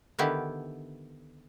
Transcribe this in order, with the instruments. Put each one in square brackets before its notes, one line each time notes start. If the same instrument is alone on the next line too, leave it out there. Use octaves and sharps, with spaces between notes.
[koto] D3 D#3 B3 E4 G4